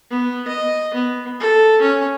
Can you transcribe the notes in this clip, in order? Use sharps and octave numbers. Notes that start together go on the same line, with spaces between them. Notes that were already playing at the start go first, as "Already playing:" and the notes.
B3
D#5
B3
A4
C#4